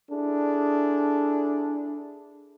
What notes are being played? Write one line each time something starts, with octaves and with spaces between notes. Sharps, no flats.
D4 E4 G#4 A4